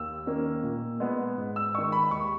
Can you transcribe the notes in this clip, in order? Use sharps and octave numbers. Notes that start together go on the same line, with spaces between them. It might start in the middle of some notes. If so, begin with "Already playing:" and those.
Already playing: D#2 E6
D#3 A#3 C#4
A#2
G#3 B3
G#2
E6
D#3 G#3 C#6
B5
D#2 C#6